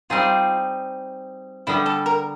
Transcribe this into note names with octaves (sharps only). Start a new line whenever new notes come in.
G3 C4 D#4 F4 G#4
D3 G3 B3 E4
A4
A#4